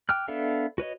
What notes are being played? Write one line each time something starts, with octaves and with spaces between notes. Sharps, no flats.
G5 D6 F6 F#6
B3 D4 A4 E5 F5
F#4 B4 C#5 D#5